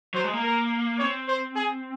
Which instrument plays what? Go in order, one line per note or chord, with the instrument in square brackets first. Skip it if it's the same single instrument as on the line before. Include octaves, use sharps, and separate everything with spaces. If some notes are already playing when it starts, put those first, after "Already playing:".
[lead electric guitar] F#3 [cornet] C5
[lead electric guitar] G#3
A#3
[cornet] A#4
[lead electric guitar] C4 [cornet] C#5
[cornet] C5
G#4